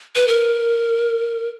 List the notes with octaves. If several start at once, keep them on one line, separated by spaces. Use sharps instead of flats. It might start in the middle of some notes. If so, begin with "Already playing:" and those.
B4
A#4